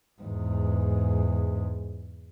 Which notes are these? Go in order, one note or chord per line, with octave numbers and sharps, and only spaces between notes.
E2 G#2